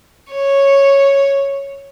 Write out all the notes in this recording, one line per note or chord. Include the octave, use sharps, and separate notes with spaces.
C#5